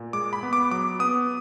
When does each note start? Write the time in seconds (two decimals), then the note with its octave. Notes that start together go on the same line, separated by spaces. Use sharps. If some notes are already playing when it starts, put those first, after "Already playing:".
Already playing: A#2
0.13 G#3 D6
0.33 B5
0.43 B3
0.53 D6
0.71 F#3 D6
0.99 B3 D#6